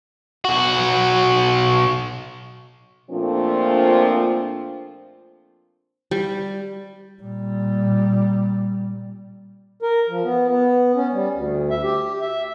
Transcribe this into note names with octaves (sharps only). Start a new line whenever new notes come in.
B1 F#4
A#2 F3 A3 C4 D4
G3
A#2 G3
A#4
F3
B3
B3
C#4
G3
D2
E5
G4
E5